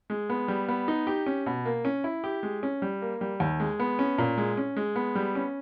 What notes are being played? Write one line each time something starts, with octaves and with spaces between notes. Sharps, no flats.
G#3
B3
G3
B3
D#4
G4
C#4
B2
A#3
C#4
E4
G4
G#3
C#4
G3
A#3
G3
D#2
G#3
B3
C#4
A#2
G#3
C#4
G#3
B3
G3
C#4